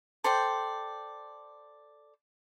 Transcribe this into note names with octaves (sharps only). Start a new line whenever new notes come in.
A4 C5 D5 G5